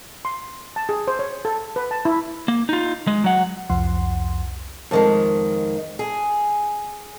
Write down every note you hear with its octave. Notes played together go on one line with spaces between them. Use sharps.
C6
A5
G#4
C5
C#5
A4
B4
A5
E4
A#3
D#4 F4
G#3
F#3 F#5
C2 F2 F3 F#5 C6
F2 D#3 G#3
G#4